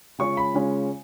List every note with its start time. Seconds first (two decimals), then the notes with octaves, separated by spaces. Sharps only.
0.19 C#3 G#3 C#4 F4 C#6
0.37 B5
0.54 C#3 G#3 C#4 F4